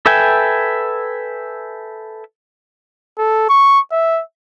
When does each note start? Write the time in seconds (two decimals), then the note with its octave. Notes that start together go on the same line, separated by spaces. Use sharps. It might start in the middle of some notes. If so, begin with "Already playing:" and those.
0.06 A4 B4 E5 G5 G#5
3.18 A4
3.49 C#6
3.92 E5